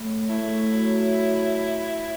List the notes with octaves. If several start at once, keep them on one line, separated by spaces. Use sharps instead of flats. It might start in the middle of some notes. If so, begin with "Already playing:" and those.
Already playing: A2
A3 E4
F#3